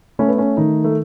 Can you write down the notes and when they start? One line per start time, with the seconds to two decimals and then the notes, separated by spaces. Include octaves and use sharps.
0.19 A3 C#4
0.28 B3
0.38 C#4
0.57 D#3 D#4
0.84 A3